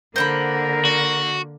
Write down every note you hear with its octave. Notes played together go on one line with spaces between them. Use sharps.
D3 A#3 A#4 C5 F#5 B5
F#4